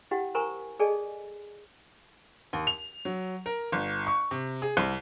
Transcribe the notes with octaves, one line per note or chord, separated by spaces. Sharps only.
E4 G4 F#5 G5
A#4 C5 G#5 A#5 C#6
G#4 A4 D5 D#5 G#5 A5
D#2
F7
F#3
A#4
G1
C#6
C3
G#4
C2